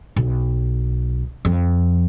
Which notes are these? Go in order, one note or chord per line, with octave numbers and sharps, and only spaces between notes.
B1
F2